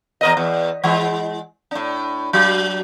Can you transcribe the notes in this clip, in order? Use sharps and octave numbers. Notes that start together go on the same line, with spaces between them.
E2 A#4 D#5
E2
E3 G#3
A2 D4
F#3